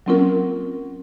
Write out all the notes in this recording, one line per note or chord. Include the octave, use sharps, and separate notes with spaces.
F#3 A#3 C4 C#4 F4 A#4